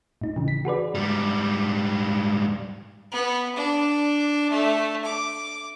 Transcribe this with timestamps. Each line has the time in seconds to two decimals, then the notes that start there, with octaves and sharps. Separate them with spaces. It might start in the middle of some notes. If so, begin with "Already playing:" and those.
0.21 A2 D#4
0.36 C#3 E3
0.48 B6
0.65 F#4 G#4 B4 D5
0.95 G#2 G3
3.12 B3
3.56 D4
4.51 A3
5.05 D6